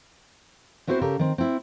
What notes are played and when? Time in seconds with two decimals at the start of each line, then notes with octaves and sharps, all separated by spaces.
0.87 B3 C4 E4 F#4 B4 C5
1.01 C#3 G4 A4 A#4
1.19 D#3 C4
1.38 C4 E4